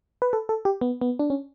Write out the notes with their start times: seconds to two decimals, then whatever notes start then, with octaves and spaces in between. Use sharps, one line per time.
0.22 B4
0.33 A4
0.49 A4
0.65 G4
0.81 B3
1.01 B3
1.19 D4
1.30 C#4